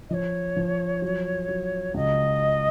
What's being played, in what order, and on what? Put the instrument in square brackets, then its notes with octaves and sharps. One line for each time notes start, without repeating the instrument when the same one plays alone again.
[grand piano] F3 [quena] C#5 D#5
[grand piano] F3
F#3
F#3
[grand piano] C#2 [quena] D#5